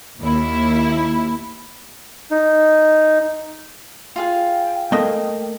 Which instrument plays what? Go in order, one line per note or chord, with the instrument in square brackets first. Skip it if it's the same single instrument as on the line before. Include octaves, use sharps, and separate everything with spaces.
[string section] D#2 E4
[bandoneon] D#4
[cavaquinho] F4 G#4 F5 [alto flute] G5
[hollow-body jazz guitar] A3 A#3 D#5